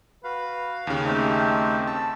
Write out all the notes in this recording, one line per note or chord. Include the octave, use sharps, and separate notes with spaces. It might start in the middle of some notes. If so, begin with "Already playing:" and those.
F#4 B4 F5
D#2 C#3
A3 C4 D#4 G4
A5 E6